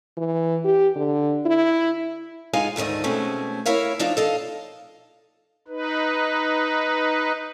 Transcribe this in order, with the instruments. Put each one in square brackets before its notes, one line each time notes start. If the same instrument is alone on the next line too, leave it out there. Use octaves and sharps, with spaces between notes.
[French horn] E3
G4
D3
E4
[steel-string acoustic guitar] G#2 G#3 D#4 F4 F5 G#5
D2 G#2 D#3 A3 D#5
B2 G#3 A3 C4 C#4
E4 A#4 C#5 E5 F5
F3 A#3 D4 D#4 F4
A4 D#5 F5
[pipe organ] D#4 B4